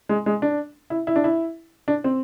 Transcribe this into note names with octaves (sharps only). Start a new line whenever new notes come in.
G#3
G#3
D4
E4
E4
D4
E4
D4
C4